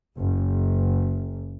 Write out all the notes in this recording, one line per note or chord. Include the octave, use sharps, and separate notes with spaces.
F#1